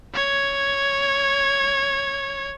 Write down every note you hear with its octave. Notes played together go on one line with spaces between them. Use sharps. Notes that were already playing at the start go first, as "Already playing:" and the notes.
C#5 G#6